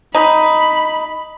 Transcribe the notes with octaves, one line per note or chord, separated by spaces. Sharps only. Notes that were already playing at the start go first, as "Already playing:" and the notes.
D#4 B5